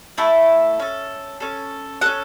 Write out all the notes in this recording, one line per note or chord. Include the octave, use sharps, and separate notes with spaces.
A3 E4 A4
C#4 A4
C#4 A4
C#4 A4 F#5